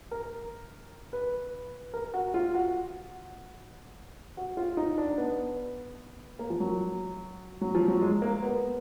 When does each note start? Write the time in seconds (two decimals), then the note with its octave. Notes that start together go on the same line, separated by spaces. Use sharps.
0.11 A#4
1.13 B4
1.94 A#4
2.14 F#4
2.34 F4
2.55 F#4
4.37 F#4
4.57 F4
4.77 D#4
4.98 D4
5.18 B3
6.39 A#3
6.50 F3
6.60 F#3
7.61 F#3
7.75 F3
7.88 F#3
8.02 G#3
8.22 A#3
8.42 B3